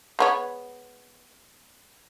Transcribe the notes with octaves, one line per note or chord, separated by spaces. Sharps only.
G#3 B3 C#5